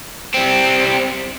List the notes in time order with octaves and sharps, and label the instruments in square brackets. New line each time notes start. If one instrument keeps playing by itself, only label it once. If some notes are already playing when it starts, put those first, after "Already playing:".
[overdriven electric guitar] G3 C4